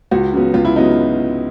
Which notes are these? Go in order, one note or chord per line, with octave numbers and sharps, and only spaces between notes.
C#2 F#4
C#3 F#3 B3
C#2 F4
E4
C#3 F#3 B3 D#4